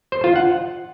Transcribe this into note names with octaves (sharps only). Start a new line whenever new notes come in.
C5
F4
F#5